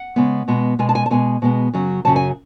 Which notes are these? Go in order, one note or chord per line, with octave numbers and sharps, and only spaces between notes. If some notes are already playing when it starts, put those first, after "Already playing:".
Already playing: F#5
C#3 G#3 B3
B2 G#3 B3
B2 G#3 B3 G#5
A5
G#5
A5
B2 G#3 B3 G#5
B2 G#3 B3
F#2 C#3 F#3
F#2 C#3 F#3 A5
G#5